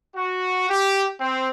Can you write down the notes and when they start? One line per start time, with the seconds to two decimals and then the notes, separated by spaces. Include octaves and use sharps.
0.16 F#4
0.70 G4
1.20 C4